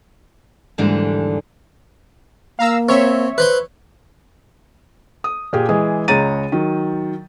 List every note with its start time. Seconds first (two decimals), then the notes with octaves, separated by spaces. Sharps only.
0.78 D#2 G#2 D3 E3 G3 D4
2.59 A#3 F5 A#5 E6
2.89 C4 C#5 E5
3.38 B4 C5 C6
5.24 D#6
5.53 A#2 G4 G#4
5.69 E3 G#3 G#4
6.08 C#2 G#3 C#5 A#5 A6 D#7
6.52 D#3 F#3